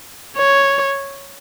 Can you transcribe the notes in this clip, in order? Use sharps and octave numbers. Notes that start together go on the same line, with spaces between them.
C#5